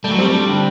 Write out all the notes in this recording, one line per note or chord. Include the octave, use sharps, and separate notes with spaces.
G3 A3
F#3
G3 C4
G2
D3